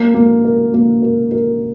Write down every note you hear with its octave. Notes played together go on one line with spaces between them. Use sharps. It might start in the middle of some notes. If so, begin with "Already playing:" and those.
Already playing: A#3
A#3
A#4
A#3
A#4
A#4